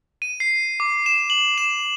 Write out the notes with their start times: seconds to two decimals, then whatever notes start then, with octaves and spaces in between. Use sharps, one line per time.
0.22 D#7
0.40 C7
0.80 D6
1.06 E7
1.30 F#7
1.58 E7